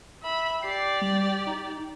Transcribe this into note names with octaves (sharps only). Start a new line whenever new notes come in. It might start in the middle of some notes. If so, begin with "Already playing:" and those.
E5 B5
G4 D5 C7
G3
D#4